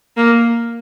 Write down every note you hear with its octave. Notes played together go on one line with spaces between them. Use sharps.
A#3